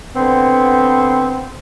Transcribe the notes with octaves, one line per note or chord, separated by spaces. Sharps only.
D3 B3 C4